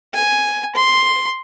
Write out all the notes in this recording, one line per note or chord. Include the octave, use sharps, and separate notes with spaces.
G#5
C6